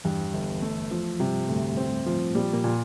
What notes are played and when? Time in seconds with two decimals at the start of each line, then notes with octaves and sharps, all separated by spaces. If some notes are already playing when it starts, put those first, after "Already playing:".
0.04 E2 G2 E3
0.34 G1
0.62 A3
0.91 F3
1.19 G2 C3 G3
1.48 D2 A2 A3
1.77 C4
2.06 F3
2.35 A#2 G3 A#3
2.53 A#2 A#3
2.64 A#2